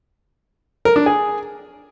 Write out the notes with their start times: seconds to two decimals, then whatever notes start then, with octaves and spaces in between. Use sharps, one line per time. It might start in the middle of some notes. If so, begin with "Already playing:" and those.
0.85 A#4
0.96 D4
1.06 G#4